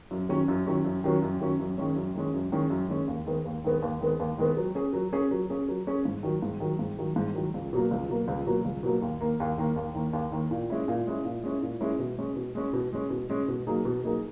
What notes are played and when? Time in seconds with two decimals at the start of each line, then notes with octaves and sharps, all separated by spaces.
0.11 F#2
0.29 D#3 F#3 C#4
0.48 F#2
0.67 D#3 F#3 C#4
0.85 F#2
1.04 D#3 F#3 C#4
1.22 F#2
1.40 D#3 F#3 C#4
1.60 F#2
1.78 D#3 G#3 C#4
1.96 F#2
2.15 D#3 G#3 C#4
2.34 F#2
2.52 D#3 G#3 C#4
2.70 F#2
2.89 D#3 G#3 C#4
3.08 D#2
3.26 D#3 G#3 B3
3.45 D#2
3.64 D#3 G#3 B3
3.82 D#2
4.01 D#3 G#3 B3
4.19 D#2
4.38 D#3 G#3 B3
4.57 F#3
4.75 C#4 G#4
4.93 F#3
5.13 C#4 G#4
5.31 F#3
5.50 C#4 G#4
5.69 F#3
5.87 C#4 G#4
6.05 G#2
6.23 D#3 F#3
6.42 G#2
6.60 D#3 F#3
6.79 G#2
6.99 D#3 F#3
7.16 G#2
7.35 D#3 F#3
7.54 C#2
7.73 B2 F#3 A#3
7.91 C#2
8.09 B2 F#3 A#3
8.28 C#2
8.46 B2 F#3 A#3
8.65 C#2
8.83 B2 F#3 A#3
9.02 D#2
9.21 D#3 A#3
9.40 D#2
9.58 D#3 A#3
9.76 D#2
9.95 D#3 A#3
10.13 D#2
10.32 D#3 A#3
10.51 A#2
10.70 G#3 C#4 E4
10.88 A#2
11.07 G#3 C#4 E4
11.24 A#2
11.43 G#3 C#4 E4
11.62 A#2
11.81 G#3 C#4 E4
11.99 B2
12.18 G#3 C#4
12.36 B2
12.55 G#3 C#4
12.73 B2
12.93 G#3 C#4
13.10 B2
13.30 G#3 C#4
13.48 B2
13.67 F#3 A#3 D#4 G#4
13.85 B2
14.04 F#3 A#3 D#4 G#4